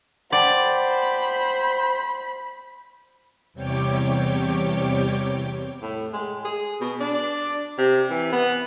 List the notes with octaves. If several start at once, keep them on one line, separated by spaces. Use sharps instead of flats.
C5 D5 F#5 G5 A5 B5
E2 C3 G3 C#5 G5 D6
A2
G#3
G#4
B2
D4
C3
E3
B3